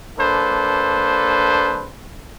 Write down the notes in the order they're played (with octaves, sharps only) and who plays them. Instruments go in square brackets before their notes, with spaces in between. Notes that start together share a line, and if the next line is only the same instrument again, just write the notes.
[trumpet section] A#3 D4 A4 B4 C5